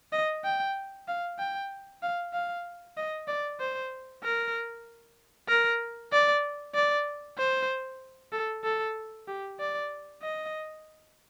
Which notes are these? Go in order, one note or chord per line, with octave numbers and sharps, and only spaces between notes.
D#5
G5
F5
G5
F5
F5
D#5
D5
C5
A#4
A#4
D5
D5
C5
A4
A4
G4
D5
D#5